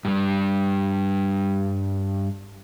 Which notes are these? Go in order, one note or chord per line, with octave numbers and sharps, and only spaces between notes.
G2 G3